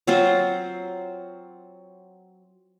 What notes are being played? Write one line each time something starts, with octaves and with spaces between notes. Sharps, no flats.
F#3 C4 F4 C5